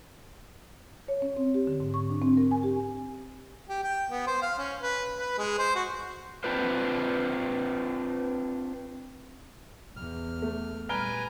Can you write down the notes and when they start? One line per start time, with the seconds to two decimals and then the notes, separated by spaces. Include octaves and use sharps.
1.08 C#5
1.22 C#4
1.37 C4
1.54 G4
1.67 D3
1.80 G#2
1.94 C#6
2.10 D4
2.22 C4
2.37 A#4
2.51 G#5
2.63 G4
3.69 G4
3.83 G5
4.10 B3
4.27 C5
4.42 F5
4.58 C#4
4.82 B4
5.18 B4
5.38 G#3
5.58 C5
5.76 F#4
6.44 C4 D4 F4 B4 C5
9.96 E2 F6
10.42 A3
10.89 A#2 G3 B4 G#5 A#5 F6 D7 G7